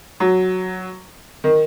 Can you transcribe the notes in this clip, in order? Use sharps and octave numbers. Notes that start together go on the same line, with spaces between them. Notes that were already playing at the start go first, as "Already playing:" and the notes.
F#3
D#3